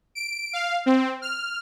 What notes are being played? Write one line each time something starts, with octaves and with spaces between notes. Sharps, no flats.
D7
F5
C4
F6